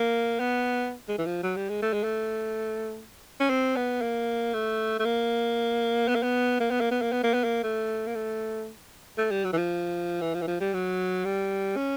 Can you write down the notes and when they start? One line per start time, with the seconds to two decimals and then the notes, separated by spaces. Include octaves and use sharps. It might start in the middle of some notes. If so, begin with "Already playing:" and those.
Already playing: A#3
0.40 B3
1.09 G#3
1.19 E3
1.26 F3
1.43 F#3
1.57 G3
1.69 G#3
1.82 A3
1.93 G#3
2.04 A3
3.40 C#4
3.50 C4
3.76 B3
4.02 A#3
4.54 A3
4.99 A3
5.05 A#3
6.08 B3
6.15 A#3
6.23 B3
6.60 A#3
6.71 B3
6.81 A#3
6.91 B3
7.02 A#3
7.12 B3
7.23 A#3
7.34 B3
7.44 A#3
7.63 A3
8.07 A#3
8.15 A3
9.18 A3
9.31 G3
9.45 F#3
9.53 E3
9.57 F3
10.22 E3
10.34 F3
10.42 E3
10.48 F3
10.60 G3
10.74 F#3
11.25 G3
11.77 C#4